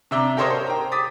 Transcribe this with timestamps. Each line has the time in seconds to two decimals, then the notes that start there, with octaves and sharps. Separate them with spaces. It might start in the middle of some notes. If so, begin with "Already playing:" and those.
0.11 C3 D4 E5 A#5 D6 G7
0.37 G4 A4 A#4 C5 C#5 D#5
0.50 C5
0.67 G5 A#5
0.92 D6 D#6 A6 B6